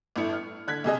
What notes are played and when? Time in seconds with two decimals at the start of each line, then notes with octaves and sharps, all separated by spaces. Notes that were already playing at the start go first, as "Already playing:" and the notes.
0.16 G1 A2 E4 C#7
0.33 F6
0.67 D3 F#6 G#6 B6
0.84 B1 C3 G#4 D#5